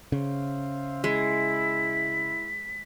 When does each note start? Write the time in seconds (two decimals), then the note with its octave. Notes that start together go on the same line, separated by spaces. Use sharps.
0.12 C#3 C5 E5 F5
1.04 G#3 E4 B6